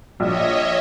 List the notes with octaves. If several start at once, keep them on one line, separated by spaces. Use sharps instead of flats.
A#1 C#5 D#5 E5